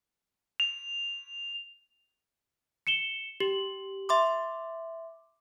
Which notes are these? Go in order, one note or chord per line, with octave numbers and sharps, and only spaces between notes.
F7
C#7 E7 G7
G4 F#7
E5 C6 D6